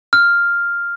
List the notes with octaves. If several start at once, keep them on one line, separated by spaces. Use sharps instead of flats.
F6